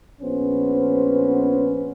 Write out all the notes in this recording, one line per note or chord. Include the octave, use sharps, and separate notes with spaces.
A#1 B3 C#4 C5